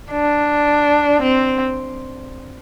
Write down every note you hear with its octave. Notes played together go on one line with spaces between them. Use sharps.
D4
C4